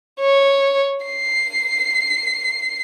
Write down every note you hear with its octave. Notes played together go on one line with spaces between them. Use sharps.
C#5
C7